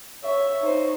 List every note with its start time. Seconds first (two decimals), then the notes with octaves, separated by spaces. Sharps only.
0.24 C#5 E5
0.62 D#4 C5